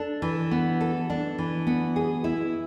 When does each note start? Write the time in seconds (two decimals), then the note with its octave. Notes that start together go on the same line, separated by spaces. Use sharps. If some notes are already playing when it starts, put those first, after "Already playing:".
Already playing: D4 A4
0.22 E3
0.51 B3
0.81 A4
1.10 D4
1.38 E3
1.67 B3
1.96 G#4
2.24 E4